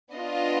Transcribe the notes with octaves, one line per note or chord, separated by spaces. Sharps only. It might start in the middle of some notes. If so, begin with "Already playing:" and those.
B3 D4 F4 D#5